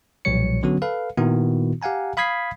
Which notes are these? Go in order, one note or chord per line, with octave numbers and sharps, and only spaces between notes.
B1 A#2 F3 G3 C#5 C#7
D3 F#3 B3 C#4 F#4
A4 B4 F5
A#2 D#3 B3 E4 F#4
G4 F5 F#5 G#5 A#5
F5 B5 D#6 G#6 B6 C7